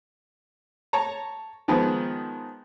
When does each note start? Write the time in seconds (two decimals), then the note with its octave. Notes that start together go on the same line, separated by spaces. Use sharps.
0.93 C#5 A5 A#5
1.68 D#3 F3 G#3 B3